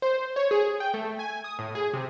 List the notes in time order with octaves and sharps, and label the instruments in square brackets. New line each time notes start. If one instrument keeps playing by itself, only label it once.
[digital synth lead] C5
C#5
G#4
G5
A3
G#5
D#6
A2
G#4
C3